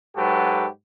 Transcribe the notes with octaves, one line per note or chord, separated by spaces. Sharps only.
G#2 F#3 F#4 G4 A4 B4